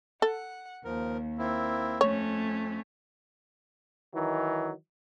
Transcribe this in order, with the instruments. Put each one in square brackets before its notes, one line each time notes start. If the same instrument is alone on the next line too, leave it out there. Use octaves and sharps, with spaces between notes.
[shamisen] A4 [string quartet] F#5
[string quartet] D#2 [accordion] F3 A#4
[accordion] A#3 C4 E4
[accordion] F2 [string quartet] A3 C#4 [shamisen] C#5
[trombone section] D#3 E3 F#3 D#4